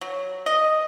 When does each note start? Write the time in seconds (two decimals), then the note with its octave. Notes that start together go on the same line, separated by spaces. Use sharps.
0.01 F#3
0.46 D#5